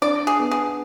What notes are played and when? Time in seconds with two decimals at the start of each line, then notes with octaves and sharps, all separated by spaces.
0.02 D4 D5
0.27 G#4
0.39 B3
0.51 G#4